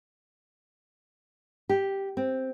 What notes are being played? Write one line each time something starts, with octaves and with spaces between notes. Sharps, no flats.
G4
C4